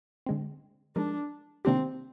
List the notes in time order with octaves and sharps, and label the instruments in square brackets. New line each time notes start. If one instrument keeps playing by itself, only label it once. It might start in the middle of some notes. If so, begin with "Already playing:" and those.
[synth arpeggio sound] D3 G#3 C4
[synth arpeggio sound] F3 G#3 D#4 A#4 [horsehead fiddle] D4
[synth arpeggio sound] C3 D#3 A#3 D4 G4 [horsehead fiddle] C4